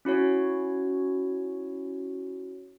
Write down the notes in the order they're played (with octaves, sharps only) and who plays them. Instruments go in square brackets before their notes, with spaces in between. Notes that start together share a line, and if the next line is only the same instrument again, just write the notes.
[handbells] C#4 E4 F#4 C#5